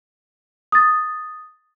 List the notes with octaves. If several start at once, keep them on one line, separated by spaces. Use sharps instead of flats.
D#6 A6